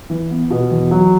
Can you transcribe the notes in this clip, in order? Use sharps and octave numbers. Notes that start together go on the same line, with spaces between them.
E3
B3
B2
E2
F#3